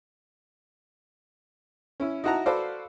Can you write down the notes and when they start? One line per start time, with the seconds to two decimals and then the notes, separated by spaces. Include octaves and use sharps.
2.00 C#4 E4
2.24 D#4 E4 F#4 F#5 A5 A#5
2.46 F#4 A4 B4 C5 D5 F5